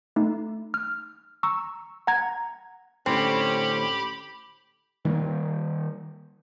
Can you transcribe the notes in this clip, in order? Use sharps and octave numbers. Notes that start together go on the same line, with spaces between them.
A3 D#4
F6
A#5 C#6 E6
F#5 A#5 G#6
A2 D3 C4 C#4 G4 B5
D#3 G3 A#3